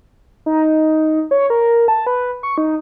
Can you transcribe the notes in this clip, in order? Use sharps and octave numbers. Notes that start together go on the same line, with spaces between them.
D#4
C#5
A#4
A5
B4
C#6
D#4